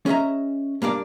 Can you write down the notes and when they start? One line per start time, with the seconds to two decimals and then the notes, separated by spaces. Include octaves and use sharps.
0.06 C#4 G#4 D#5 E5 A#5
0.82 G2 A#3 D4 D5